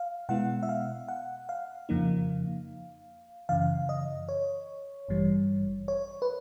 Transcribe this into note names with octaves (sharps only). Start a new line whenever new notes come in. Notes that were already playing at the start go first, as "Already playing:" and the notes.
Already playing: F5
B2 G#3 B3 E4 F#5
E5
F5
F#5
F5
F2 C#3 F3 A#3 D#4
F#2 C#3 E3 F5
D#5
C#5
A1 G2 E3 G3
C#5
B4